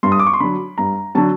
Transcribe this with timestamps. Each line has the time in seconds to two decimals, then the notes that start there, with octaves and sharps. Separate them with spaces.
0.03 G2 C6
0.12 D#6
0.19 D6
0.27 C#6
0.34 C6
0.40 D3 F#3 B5
0.78 G2 A#5
1.15 D3 F#3 A5